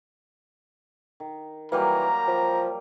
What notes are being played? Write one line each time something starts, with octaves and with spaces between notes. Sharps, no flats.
D#3
E3 F#3 G3 A#3 A#5
F3